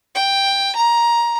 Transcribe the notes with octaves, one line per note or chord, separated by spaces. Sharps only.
G5
A#5